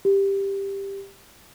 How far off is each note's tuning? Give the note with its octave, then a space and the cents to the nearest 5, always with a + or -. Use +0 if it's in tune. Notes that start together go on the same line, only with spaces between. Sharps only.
G4 +10